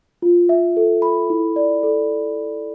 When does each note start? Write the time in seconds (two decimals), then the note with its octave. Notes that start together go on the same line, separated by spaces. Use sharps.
0.22 F4
0.49 E5
0.77 A4
1.02 B5
1.30 E4
1.56 D5
1.83 A4